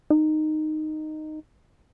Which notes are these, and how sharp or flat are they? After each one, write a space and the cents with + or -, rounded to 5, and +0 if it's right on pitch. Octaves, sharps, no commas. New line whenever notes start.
D#4 -10